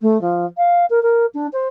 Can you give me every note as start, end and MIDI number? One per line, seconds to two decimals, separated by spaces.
0.02 0.20 57
0.21 0.45 53
0.57 0.85 77
0.90 1.02 70
1.02 1.26 70
1.34 1.47 62
1.53 1.68 72